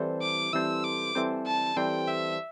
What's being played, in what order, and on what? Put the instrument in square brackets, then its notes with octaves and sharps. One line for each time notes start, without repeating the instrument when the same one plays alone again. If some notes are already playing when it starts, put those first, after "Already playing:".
Already playing: [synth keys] E3 G3 C4 A4 C5
[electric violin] D6
[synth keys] E3 G3 C4 A4 C5 [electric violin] E6
[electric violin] D6
[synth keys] E3 G3 C4 A4 C5
[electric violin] A5
[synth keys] E3 G3 C4 A4 C5 [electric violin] G5
[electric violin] E5